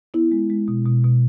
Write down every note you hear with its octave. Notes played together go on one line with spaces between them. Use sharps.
B3 E4
G#3
G#3
B2
B2
B2